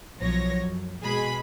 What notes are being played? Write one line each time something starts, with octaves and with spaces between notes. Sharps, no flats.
B1 F3 F#3 C#5 A#6
F#2
B2 G#3 G#4 B5